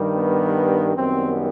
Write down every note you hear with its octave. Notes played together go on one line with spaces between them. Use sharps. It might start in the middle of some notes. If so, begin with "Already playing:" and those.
Already playing: G2 D#3 G3
B3
F#2 D#3 G3 B3 C4